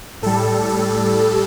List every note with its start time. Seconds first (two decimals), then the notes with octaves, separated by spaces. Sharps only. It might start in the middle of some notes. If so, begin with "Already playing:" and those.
0.22 A2 G3 A4
0.69 A4